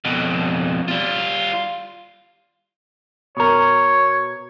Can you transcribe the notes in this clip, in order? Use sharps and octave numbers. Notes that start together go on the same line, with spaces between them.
F2 B2
G3 F4
B2 A#4 C#5